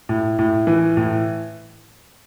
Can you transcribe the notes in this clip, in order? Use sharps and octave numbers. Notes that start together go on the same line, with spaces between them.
A2
A2
E3
A2